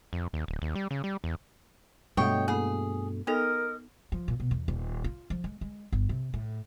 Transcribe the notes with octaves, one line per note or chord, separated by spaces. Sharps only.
F2
D#2
D1
D#2
G3
C#3
G3
E2
G2 B2 G#3 A3 C#5 D#5 F#5 G5
A#3 E4 G#4 A4
B3 D#4 A4 A#4 D#5
F3
A#2
B2
E2
D#1
F4
F3
G#3
G#3
G1
C3
A2